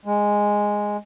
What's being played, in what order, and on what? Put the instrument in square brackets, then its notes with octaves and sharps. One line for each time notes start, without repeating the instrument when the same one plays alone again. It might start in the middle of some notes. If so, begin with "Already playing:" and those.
[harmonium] G#3